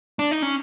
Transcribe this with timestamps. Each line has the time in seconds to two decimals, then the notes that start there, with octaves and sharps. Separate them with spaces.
0.19 D4
0.31 D#4
0.42 C#4